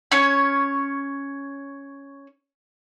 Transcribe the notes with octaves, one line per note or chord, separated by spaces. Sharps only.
C#4 C#5